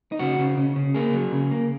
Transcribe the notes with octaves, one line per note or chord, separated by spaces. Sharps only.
D#4
C#3 F#4
C#3
C#3
C#3
A#3 G#4
F#3
C#3
A#3